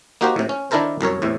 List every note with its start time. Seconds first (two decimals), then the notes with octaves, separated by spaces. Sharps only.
0.21 A#3 D#4 F#4 G4 A#4 C5
0.36 A2 C3
0.49 C#4
0.71 D#3 D4 E4 A4 A#4 C5
1.01 C2 F#2 A#4 C#5
1.22 E2 A2 C3